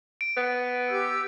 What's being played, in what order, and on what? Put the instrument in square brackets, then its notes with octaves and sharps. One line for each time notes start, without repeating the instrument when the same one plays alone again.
[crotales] D7
[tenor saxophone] B3
[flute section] G4 E6 G6